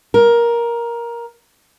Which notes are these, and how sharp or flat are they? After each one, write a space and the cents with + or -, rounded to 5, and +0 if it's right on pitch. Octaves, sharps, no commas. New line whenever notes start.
A#4 +10